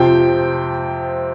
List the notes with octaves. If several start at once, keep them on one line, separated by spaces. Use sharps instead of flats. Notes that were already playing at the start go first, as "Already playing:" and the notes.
Already playing: F2 C3 F3 G5